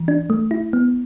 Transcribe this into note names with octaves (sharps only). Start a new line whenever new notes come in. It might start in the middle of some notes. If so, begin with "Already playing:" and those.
Already playing: E3
D4
A3
E4
B3